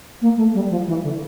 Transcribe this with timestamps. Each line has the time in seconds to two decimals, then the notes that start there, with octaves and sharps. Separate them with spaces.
0.21 A#3
0.36 A3
0.54 G3
0.69 F3
0.87 E3
1.02 D3